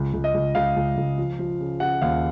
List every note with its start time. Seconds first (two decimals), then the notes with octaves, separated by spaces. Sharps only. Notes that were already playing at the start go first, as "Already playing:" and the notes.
Already playing: C#2
0.13 C#2
0.24 D#5
0.34 C#2
0.55 C#2 F5
0.76 C#2
0.97 C#2
1.18 F3
1.39 F3
1.60 C#3
1.80 C#3 F#5
2.02 D#2 F5